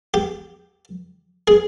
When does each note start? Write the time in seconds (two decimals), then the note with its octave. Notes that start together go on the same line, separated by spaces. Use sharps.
0.14 G4
1.48 G#4